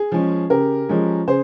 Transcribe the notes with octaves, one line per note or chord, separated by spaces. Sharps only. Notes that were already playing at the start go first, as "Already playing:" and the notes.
Already playing: G#4
F3 G#3 C#4
C#3 G4 A#4
F3 G#3 C#4
C#3 G#4 C5